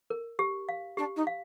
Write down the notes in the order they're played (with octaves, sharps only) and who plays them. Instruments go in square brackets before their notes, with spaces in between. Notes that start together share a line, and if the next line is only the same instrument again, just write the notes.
[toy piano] A#4
G4
F5
[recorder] D4 [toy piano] G4
[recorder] D#4
[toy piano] F5